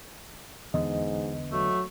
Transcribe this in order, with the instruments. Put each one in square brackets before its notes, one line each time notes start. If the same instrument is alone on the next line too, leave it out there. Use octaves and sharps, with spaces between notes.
[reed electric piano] E2 D#5 [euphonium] G#2 [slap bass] D3 B3
[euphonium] F#3 [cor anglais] A3